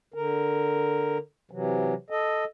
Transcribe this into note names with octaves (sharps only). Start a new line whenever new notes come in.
D3 A#4
C3 E3 F#3
A4 D#5